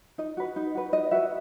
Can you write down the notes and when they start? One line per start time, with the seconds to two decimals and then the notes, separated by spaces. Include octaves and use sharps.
0.18 D#4 D#5
0.37 F#4 B4
0.56 D#4
0.75 F#4 B4
0.92 D#4 D#5
1.11 F#4 B4 E5